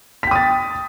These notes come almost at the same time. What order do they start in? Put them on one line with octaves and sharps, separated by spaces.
B6 G5 D#6 A6